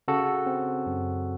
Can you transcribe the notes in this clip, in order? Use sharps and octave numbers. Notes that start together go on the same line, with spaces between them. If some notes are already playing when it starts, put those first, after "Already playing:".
C#3 F#4 A4
C4
F#2